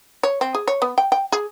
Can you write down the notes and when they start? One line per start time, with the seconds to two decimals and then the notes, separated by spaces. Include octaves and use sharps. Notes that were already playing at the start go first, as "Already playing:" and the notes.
0.23 C#5
0.41 C4
0.55 G#4
0.68 C#5
0.82 B3
0.98 G5
1.12 G5
1.32 G#4